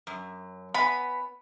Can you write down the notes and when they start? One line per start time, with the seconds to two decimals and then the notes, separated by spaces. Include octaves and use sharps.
0.07 F#2
0.74 B3 G#5 B5